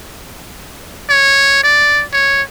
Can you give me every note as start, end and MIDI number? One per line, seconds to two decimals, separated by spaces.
1.09 1.63 73
1.64 2.04 74
2.13 2.42 73